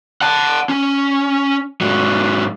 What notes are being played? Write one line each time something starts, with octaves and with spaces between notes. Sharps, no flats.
F#5 A5
C#4
G#2 F#3